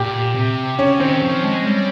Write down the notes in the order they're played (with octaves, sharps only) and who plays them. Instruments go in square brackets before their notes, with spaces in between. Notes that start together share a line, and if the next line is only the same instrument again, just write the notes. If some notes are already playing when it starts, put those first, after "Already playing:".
Already playing: [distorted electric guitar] A#2 [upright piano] G4
[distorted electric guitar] C3
[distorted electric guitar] C#3 [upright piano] C#4
[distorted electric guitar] D#3 [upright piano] C4
[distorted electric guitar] F3
G#3
G3